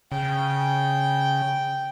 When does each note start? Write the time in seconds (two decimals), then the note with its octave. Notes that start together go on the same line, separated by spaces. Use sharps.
0.12 C#3 G5